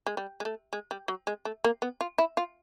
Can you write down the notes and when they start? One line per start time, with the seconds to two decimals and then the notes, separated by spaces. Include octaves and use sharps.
0.06 G#3
0.17 G3
0.40 G#3
0.45 A3
0.73 G#3
0.91 G3
1.08 F#3
1.27 G#3
1.45 A3
1.64 A#3
1.82 B3
2.01 F4
2.18 E4
2.37 F4